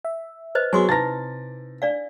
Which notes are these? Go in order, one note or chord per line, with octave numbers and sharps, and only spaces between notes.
E5
B4 C5 D#5
F#3 B3 G#4 C#5 G#5 C6 D6
C3 D#4 E4 B4 A6 A#6
D4 D5 F5